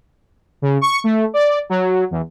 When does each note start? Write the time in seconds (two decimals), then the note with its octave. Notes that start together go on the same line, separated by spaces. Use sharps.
0.62 C#3
0.81 C#6
1.04 A3
1.34 D5
1.69 F#3
2.11 E2